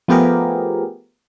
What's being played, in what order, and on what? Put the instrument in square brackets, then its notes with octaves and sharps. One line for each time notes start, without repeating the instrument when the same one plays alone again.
[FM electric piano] F3 A3 B3 G4 G#4 A#4